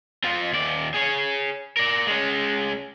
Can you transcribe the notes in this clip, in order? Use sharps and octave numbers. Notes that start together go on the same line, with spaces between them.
C4 F4
D#2 D5
G#4 C#5
A#4 D5
G#3 C#4